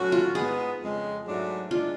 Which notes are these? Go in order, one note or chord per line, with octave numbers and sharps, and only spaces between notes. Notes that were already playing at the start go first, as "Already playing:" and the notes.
Already playing: A2 F#3 C#4 F#4
F4
G#2 G#3 B3 G#4
F2 C#3 G#3
G#2 F#3 A3 D4 F#4
G#2 G#3 D4 F4